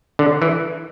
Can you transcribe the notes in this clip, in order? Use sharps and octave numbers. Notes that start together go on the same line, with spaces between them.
D3
E3